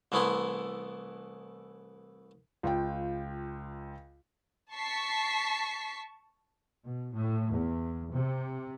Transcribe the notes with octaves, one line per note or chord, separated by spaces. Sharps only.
C2 E3 A3 B3 E4 C6
C#2 F4 G5
A5 C#6 B6 C7
B2
A2
E2
C3